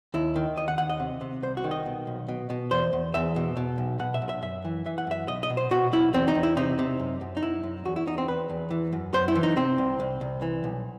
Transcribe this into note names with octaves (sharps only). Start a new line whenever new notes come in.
D#2 E4
D#3
D#2 D#5
F#5
D#2 F#5
D#5
C3
C3
C2 C5
F#4
D#3
D#5
B2
B1
B2
B2
E2 C5
E2
E2 E5
B2
B2
B1
B2 F#5
E5
B1
E5
F#2 E5
E3
E3 E5
F#5
F#2 E5
B1 D#5
D#5
B2
C5
B2 F#4
B1 E4
E2 C4
D#4
E2
E4
C3 D#4
C3
F#2
F#2
D#4
F#2 E4
F#2
E2 F#4
E4
E2 D#4
C4
E2 B4
E2
E3
F#2
F#2 C5
E4
E3
D#4
C3 C4
C2
C2
C2
E3
B1